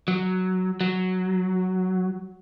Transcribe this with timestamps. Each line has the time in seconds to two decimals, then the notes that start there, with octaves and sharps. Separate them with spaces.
0.08 F#3
0.81 F#3